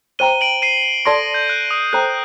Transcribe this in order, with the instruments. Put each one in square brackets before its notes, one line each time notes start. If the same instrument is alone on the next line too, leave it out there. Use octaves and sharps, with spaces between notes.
[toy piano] C5 G5 A#5 [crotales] D#7 G7
[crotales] D7 F#7
C7 D#7
[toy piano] A4 D5 A5 C6 [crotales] A#6 D7
[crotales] G6
F#6
D#6
[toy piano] A4 C5 G5 A#5 [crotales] F#6